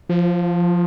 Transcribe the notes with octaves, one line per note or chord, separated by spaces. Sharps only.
F3